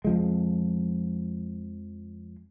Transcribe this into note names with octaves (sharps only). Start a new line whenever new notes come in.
F2 F3 G#3